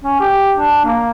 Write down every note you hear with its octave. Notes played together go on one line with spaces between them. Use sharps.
C#4
G4
D4
A#3